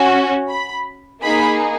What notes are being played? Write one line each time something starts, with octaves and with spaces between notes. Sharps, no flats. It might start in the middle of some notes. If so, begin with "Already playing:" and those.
Already playing: C#4 F#4
B5
A#3 D#4 G#4 B5